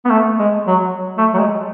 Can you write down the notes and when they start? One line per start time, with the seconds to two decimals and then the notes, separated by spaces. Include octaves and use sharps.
0.05 B3
0.10 A3
0.39 G#3
0.67 F#3
1.18 A3
1.34 F#3
1.39 G#3